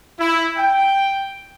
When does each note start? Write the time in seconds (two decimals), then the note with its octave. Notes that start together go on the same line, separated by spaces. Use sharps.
0.20 E4
0.57 G5